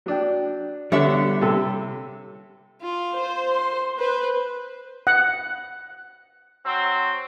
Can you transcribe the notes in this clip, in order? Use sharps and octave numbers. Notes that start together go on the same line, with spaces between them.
F#3 D4 G5
D3 G3 B3 C#5 E5
C3 A4
F4
C5
C6
B4 C5
F#5
F#3 C4